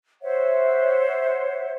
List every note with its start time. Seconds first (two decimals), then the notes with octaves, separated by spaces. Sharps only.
0.22 C5 C#5 E5 F#5